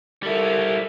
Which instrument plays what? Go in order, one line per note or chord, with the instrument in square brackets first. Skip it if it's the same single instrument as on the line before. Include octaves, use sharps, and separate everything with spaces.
[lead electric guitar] G3 E4 [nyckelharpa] A4 A#4